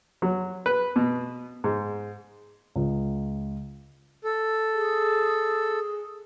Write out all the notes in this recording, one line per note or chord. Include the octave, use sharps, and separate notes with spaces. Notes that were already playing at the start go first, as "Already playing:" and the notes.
F#3
B4
B2
G#2
C#2
A4
G#4